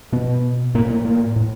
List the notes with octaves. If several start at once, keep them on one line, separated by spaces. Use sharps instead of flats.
B2 B3
A2 A#3
A#3
A#3
A2